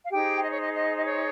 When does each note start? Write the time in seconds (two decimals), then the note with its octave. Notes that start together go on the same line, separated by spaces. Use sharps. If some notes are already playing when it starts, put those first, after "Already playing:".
0.05 F5
0.12 D#4 G4 G#4 C5 G5
0.43 D#5
0.51 C#5
0.59 D#5
0.74 D#5
0.97 D#5
1.06 C#5